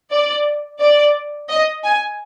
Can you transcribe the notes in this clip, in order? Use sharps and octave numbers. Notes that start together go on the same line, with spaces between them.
D5
D5
D#5
G#5